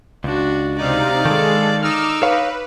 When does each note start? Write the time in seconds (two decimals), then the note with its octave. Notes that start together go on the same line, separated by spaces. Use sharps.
0.24 C#2 D4 F#4
0.78 C3 D#4 D5 F5
1.25 D#3 G#3 A4
1.82 D#4 D6 E6 F6
2.23 B4 C#5 F5